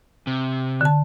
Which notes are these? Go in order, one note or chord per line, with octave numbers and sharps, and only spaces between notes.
C3
D3 A5